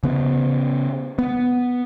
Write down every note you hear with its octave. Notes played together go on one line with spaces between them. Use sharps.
C#3 B3
B3